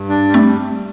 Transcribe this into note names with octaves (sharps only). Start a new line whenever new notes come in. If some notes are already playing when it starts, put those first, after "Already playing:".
Already playing: G2
D4
G3
A3 C4